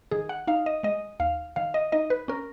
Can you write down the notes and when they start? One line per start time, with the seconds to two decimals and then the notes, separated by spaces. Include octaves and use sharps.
0.11 D#3 G#4
0.29 F#5
0.47 D#4 F5
0.66 D#5
0.83 G#3 D#5
1.20 D#2 F5
1.56 D#3 F5
1.74 D#5
1.92 D#4 D#5
2.10 B4
2.28 C#4 A#4